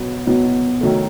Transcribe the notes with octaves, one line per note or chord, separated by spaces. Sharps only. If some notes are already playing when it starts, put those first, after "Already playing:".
Already playing: B2 F#3 B3
B2 F#3 B3
D#3 F#3 A3